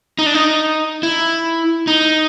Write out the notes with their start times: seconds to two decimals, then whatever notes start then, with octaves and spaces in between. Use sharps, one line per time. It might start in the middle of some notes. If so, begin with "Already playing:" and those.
0.19 D#4
0.26 D4
0.34 D#4
1.03 E4
1.87 D#4